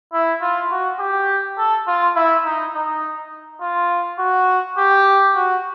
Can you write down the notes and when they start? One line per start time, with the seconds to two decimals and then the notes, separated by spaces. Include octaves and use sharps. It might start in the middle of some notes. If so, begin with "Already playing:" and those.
0.13 E4
0.41 F4
0.71 F#4
0.99 G4
1.57 A4
1.87 F4
2.16 E4
2.45 D#4
2.75 D#4
3.61 F4
4.19 F#4
4.78 G4
5.35 F#4